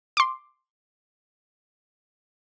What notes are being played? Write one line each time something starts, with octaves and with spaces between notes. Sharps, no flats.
C6 D6